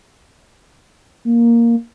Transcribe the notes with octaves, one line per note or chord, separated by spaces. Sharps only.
A#3